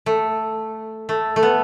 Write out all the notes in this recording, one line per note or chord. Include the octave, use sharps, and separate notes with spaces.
A3
A3
A3
B3